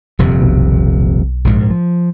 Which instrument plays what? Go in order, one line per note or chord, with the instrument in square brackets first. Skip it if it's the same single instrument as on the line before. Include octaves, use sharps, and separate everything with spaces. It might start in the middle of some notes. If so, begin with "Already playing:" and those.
[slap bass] D#1 F2 C3
[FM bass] B1
[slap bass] A#1 G#2
F3